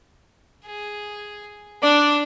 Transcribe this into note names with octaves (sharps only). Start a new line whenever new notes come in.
G#4
D4 D5